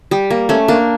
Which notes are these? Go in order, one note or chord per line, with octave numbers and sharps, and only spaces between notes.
G3
A#3
A3 C#4
A#3 D4